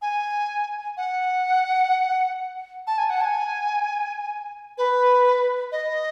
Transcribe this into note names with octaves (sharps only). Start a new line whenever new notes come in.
G#5
F#5
A5
G#5
F#5
A5
G#5
B4
D#5